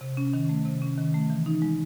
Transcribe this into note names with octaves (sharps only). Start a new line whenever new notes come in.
C3
C#4
D#3
A3
C3
C#4
D#3
A3
E3
D#4
G#3